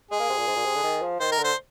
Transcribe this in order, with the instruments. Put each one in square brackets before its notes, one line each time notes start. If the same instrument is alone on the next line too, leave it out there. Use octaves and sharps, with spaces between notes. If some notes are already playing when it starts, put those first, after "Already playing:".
[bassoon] G#3 [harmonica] G#4
[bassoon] A#3
C3
A#2
G#2
A#2
C3
D3
D#3
F3
[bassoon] D#3 [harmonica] C5
[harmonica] A#4
[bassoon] D3
[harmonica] C5